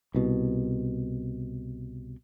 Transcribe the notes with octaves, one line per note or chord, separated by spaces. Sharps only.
C2 B2